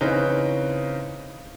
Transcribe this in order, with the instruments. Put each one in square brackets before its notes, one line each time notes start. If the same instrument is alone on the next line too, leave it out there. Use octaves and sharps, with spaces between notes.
[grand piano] C#3 E3 C4 C#4 D#4 B4